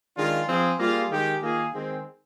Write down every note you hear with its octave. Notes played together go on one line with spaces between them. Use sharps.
D#3 G#3 D4 F4
F3 C4 F4 G#4
G3 A#3 F4 G#4
D#3 G#3 D#4 G4
D#3 A#3 F4 G#4
D#3 G#3 C4